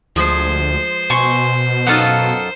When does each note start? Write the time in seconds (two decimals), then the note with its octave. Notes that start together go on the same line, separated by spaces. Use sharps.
0.16 D2 F3 G#3 C5
1.10 B2 G#5 C6 C#6
1.87 F#2 D#4 F4 A4 F#5